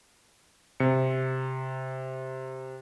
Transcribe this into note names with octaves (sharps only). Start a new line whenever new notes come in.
C3 C#7